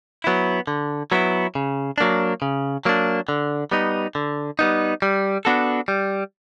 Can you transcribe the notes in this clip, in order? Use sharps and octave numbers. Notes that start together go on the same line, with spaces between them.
F#3 B3 E4
D3
F#3 B3 E4
C#3
F#3 A#3 D4
C#3
F#3 A#3 D4
D3
G3 B3 D#4
D3
G3 B3 D#4
G3
B3 D4 F#4 A4
G3